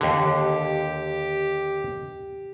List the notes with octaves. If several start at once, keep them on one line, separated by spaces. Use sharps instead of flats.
D#2 D3 G4